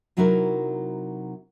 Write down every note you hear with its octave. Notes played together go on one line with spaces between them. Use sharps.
C3 F#3 D#4 E4 F#4 A#4